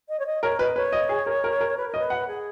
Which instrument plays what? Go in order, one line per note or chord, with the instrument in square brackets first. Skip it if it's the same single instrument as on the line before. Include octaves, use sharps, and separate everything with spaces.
[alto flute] D#5
C#5
D#5
[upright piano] A#4 [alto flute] C#5
[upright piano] B4 [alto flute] D#5
[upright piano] B4 [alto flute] C#5
[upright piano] D#5
G#4
A#4
A#4
A#4
[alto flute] B4
A#4
[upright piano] D#5
[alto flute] B4
[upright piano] F#5
[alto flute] G#4